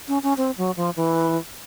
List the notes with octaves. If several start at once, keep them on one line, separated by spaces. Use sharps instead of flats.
C#4
C#4
C4
F#3
F3
E3